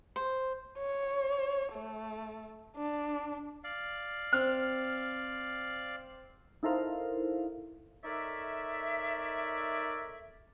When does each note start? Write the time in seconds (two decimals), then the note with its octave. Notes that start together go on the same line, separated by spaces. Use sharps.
0.16 C5
0.79 C#5
1.73 A3
2.77 D4
3.64 D5 F5
4.33 C4 F6
6.63 D#4 E4 A4 A#4 C5 F5
8.04 D#4 A4 A#4 C#5 D5 E5